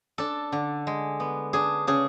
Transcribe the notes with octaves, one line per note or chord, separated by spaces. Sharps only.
D4 A4
D3
G#3
B3
D4 G#4
C#3 G#4